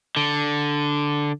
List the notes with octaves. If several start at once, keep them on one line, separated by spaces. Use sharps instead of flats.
D3